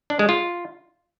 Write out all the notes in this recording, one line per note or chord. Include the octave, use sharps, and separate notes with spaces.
D4
G#3
F4